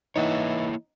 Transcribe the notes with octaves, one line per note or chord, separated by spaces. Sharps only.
E3 A#3 D#4 E4 C#5 D#5 F#5